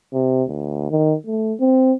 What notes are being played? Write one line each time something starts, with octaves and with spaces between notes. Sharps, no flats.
C3
D2
D#3
A3
C4